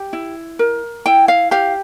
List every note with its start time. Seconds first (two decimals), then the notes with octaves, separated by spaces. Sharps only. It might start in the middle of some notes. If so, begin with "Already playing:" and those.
Already playing: G4
0.13 E4
0.59 A#4
1.06 E4 G5
1.28 F5
1.51 G4 F5